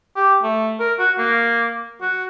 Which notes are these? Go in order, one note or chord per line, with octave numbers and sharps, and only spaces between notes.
G4
A3
A#4
F#4
A#3
F#4